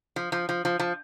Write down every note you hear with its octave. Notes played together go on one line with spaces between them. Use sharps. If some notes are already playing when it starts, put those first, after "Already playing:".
F3
F3
F3
F3
F3